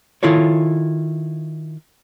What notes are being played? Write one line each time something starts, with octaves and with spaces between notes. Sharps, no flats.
D#3 E4 F4 A4 C#5